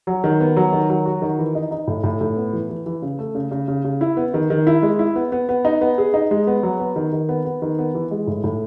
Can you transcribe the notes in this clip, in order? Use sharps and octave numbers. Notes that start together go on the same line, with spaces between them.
F#3
D#3
B3
F#3
D#3
F#3
F#4
D#3
E3
D#4
D#4
A2
A2
A2
B3
E3
E3
E3
C#3
A3
C#3
C#3
C#3
C#3
E4
B3
D#3
D#3
E4
G#3
E4
B3
B3
B3
D#4
B3
G#4
D#4
G#3
B3
F#3
B3
D#3
D#3
B3
B3
D#3
B3
E3
G#3
A2
A2